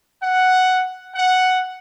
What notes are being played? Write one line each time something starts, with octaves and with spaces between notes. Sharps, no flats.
F#5
F#5